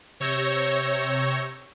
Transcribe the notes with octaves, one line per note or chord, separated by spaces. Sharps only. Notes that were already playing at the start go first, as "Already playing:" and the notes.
C3 C#5 C#6 E6 G6 A#6